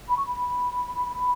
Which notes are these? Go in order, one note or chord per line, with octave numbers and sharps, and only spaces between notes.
B5
C#6
B5